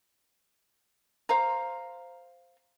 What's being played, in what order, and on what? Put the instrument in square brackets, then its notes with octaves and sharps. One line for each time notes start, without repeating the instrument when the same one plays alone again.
[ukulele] C5 F5 A#5